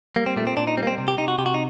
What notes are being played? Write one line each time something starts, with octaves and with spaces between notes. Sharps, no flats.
G3 A#3
C4
A#2 A3
C4
A#2 D4
D#4
G3 C4
A#3
C4
C3
G4
C3 D#4
F#4
C3 G4
F#4
D#4